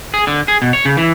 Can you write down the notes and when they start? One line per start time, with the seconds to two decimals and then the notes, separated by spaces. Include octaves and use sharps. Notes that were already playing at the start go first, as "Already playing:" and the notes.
0.14 G#4
0.27 D3
0.48 G#4
0.62 B2
0.73 C#5
0.85 C#3
0.97 E3